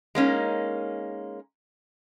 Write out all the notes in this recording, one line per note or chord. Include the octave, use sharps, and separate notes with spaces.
G#3 A#3 C#4 D#4